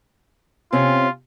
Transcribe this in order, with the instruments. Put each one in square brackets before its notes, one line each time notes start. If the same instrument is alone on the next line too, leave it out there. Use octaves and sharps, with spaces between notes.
[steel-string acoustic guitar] C3 C4 C#4 [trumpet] F4